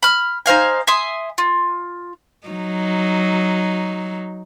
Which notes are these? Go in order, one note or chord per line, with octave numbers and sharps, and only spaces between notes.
B5 F6
D#4 C5 F5 G#5
E5 G#5 C6 D#6
F4
F#3 D#4